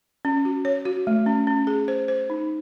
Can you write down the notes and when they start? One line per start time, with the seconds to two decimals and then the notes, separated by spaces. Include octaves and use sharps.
0.25 C#4
0.45 F#4
0.65 C#5
0.85 F#4
1.07 A3
1.26 C#4
1.47 C#4
1.67 G#4
1.88 C5
2.08 C5
2.30 D#4